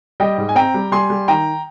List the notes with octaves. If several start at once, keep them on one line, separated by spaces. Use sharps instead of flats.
G3 D#5 G5
G#2
G#5
C4 G5 A#5
G3
G3 G#5 C6
G3
D#3 G5 A#5